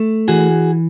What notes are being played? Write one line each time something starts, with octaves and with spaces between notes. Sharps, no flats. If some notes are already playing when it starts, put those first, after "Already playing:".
Already playing: A3
E3 F#4 G#4